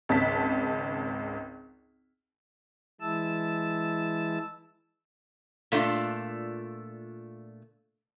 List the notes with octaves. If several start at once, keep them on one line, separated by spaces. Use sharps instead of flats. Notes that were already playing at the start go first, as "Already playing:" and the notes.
G#1 C#2 A5 B6
E3 G#3 E4 A5 E6
A#2 A3 D4 F4